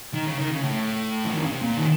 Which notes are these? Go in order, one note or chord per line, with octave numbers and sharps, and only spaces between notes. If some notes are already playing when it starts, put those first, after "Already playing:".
D#3
C#3
D#3
C#3
A2
F3
D#3
C#3
C3
A#2
D#3